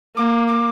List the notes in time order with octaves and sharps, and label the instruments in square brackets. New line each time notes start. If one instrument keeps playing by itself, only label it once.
[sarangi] A#3 [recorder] D6
[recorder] D6